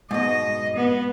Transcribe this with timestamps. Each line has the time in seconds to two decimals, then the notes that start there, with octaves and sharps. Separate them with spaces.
0.11 G#2 B2 D#5
0.76 B3